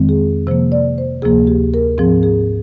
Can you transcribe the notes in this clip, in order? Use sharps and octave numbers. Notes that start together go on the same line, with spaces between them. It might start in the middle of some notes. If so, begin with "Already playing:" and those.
Already playing: F2 D#3 G#3 C4
G#4
C3 F3 A#3 C5
D5
C5
D2 C3 F3 A#3 G#4
G4
A#4
G#2 F3 C4 G#4
G#4